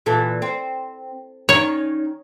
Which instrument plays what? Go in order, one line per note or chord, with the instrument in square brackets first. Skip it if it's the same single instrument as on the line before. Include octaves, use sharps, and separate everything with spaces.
[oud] A#2 E3 A4
C4
[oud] D#3 C#4 [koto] C#5